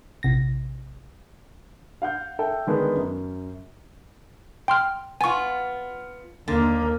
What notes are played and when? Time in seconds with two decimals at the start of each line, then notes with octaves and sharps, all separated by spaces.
0.23 A#1 C3 A#6
2.02 F5 F#5 G6
2.39 A4 E5 G5
2.67 D3 D#3 G#3 B3
2.96 F#2
4.68 G5 C6 F6
5.21 B3 F4 G#5 C#6
6.48 D#2 D3 A#3